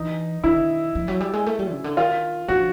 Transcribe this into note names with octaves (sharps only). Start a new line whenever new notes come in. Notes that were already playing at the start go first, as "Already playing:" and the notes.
Already playing: E3 D#4
D#3 E4
F3
F#3
G3
G#3
A3
G3
C#3
D3
D#3 F4
F3 F#4